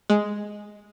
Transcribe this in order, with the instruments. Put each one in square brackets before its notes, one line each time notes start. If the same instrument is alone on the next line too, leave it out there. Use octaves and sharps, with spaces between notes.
[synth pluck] G#3